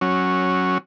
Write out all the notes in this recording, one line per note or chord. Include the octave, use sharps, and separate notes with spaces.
F#3 C#4